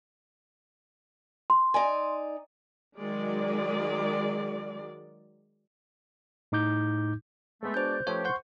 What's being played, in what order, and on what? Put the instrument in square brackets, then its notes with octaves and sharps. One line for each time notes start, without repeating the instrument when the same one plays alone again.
[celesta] C6
[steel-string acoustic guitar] D#4 D5 G#5
[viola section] D#3 F#3 G#3 D5
[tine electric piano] A2 D#4 D6 G6
[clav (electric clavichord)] G#3 B3 [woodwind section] A3
[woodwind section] D4 F#4 D5 [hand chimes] C5 G6
[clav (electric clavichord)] F3 A3 B4 [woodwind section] C#4 G4 [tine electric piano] C#5
[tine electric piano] C5 F#5 G6 [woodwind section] C6 C#6